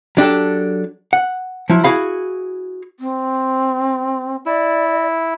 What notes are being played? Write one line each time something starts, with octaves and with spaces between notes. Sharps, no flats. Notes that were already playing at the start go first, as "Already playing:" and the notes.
F#3 D4 G4 A4
F#5
F3 F#3 E4
E4 F#4 G#4 F5 B5
C4
E4 D5